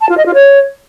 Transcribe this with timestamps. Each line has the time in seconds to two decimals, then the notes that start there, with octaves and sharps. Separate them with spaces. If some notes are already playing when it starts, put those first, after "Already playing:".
0.01 A5
0.09 F4
0.17 D#5
0.26 F4
0.34 C#5